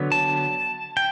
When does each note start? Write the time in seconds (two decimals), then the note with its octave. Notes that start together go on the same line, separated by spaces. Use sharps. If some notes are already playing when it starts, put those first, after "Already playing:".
Already playing: D3 F#3 B3
0.12 A5
0.97 G5